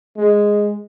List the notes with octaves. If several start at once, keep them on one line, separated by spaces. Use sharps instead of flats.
G#3